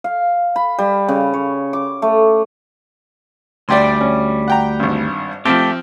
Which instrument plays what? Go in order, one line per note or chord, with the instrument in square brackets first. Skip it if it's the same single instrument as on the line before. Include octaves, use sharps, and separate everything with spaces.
[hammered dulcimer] F5
B5
G3
C#3
C#5
D6
A3
[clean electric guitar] D2 G3 [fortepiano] D5 G5 C6
[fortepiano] C#4
F#5 G5 A#5
G#1 G2
[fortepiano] F3 C4 [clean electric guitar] A3 G4